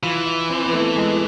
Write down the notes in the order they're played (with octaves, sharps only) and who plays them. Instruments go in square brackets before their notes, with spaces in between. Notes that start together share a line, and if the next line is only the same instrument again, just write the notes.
[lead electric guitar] E3 [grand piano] F4
[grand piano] E4
C4
B3
A3
G#3